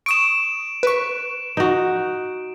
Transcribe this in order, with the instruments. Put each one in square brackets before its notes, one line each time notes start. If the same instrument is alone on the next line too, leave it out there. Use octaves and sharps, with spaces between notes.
[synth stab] C#6 D#6 [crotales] D7 E7
[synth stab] B4 C#6
[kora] D#4 F#4